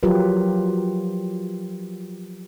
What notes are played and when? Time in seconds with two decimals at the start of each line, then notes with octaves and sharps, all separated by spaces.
0.03 F3 F#3 F4 G4 A#4 B4